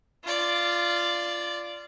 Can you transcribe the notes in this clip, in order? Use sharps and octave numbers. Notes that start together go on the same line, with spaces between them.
F4 D5